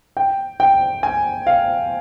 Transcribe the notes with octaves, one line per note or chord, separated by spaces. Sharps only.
G5
G5
G#5
F5